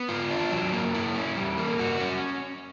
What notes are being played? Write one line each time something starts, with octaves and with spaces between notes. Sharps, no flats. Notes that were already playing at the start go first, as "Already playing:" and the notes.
Already playing: B3
F4
D4
F#3
A#3
E4
C#4
G3
A#3
F#4
C#4